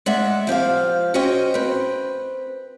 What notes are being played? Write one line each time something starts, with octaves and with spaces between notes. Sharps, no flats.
G#3 D5 E5 F#5
F3 C4 G4 F5
C#4 F#4 G#4 C5 D#5 G5
C4 B4